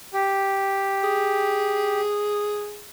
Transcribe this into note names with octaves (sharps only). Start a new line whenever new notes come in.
G4
G#4